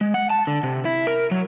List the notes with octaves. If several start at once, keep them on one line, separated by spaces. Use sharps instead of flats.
G#3
F#5
A5
D3
C3
E4
A#4
F#3